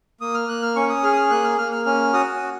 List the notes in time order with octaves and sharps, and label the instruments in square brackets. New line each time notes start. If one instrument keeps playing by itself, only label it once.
[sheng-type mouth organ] A#3 D#6
F6
A#3 F#6
F6
C#4 C#6
D#6
G#4 F6
D#6
F6
A#3 F#6
F6
A#3 F6
F6
C#4 F6
F#4 D#6